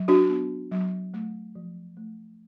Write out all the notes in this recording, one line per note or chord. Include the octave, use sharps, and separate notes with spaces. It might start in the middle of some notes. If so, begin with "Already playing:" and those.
Already playing: F#3
D4 F#4
B3
F#3
A3
F3
A3